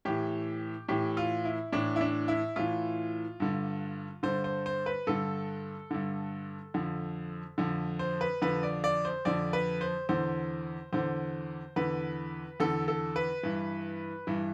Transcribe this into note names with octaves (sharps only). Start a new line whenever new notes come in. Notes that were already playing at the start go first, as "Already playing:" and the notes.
A2 E3 G4
A2 E3 G4
F4
E4
A2 E3 D4
E4
D4
E4
A2 E3 F4
G2 D3
G2 D3 C5
C5
C5
B4
G2 D3 A4
G2 D3
F2 D3
F2 D3
C5
B4
F2 D3 B4
D5
D5
C5
F2 D3 D5
B4
C5
E2 D3 C5
E2 D3 C5
E2 D3 B4
E2 D3 A4
A4
B4
G2 E3
G2 E3